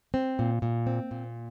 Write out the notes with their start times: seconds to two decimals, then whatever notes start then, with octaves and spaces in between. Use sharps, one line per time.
0.14 C4
0.39 A#2
0.62 A#2
0.87 C4
1.11 A#2